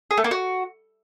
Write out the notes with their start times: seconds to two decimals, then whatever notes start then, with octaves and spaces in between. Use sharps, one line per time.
0.11 G#4
0.17 A3
0.24 A#3
0.31 F#4